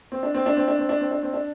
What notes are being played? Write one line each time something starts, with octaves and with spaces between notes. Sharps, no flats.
C4
D4
C4
D4
C4
D4
C4
D4
C4
D4
C4
D4